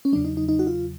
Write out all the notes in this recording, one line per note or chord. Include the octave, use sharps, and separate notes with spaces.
C#4
E2 C#3 F#3 D4
D#4
D#4
D#4
F#4
F4